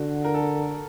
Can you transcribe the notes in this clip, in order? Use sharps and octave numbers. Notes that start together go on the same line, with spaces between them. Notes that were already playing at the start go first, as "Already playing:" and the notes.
Already playing: D3 F#4
A#4
A4